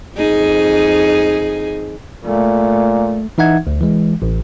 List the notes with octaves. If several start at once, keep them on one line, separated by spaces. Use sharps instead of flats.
F2 D#4 G#4
A#2 A3
E3 D#4 E5 F#5 G#6
D2
E3 G#3
A1